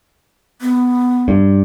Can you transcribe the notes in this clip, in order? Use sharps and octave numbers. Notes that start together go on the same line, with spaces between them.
B3
G2